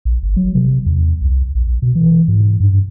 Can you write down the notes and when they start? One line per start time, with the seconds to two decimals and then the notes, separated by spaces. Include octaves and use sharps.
0.05 A#1
0.23 G1
0.36 F#3
0.55 C3
0.86 E2
1.21 C2
1.55 A#1
1.82 B2
1.95 E3
2.28 G#2
2.60 G2